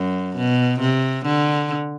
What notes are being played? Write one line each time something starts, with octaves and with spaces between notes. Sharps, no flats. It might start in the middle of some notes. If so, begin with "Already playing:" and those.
Already playing: F#2
B2
C3
D3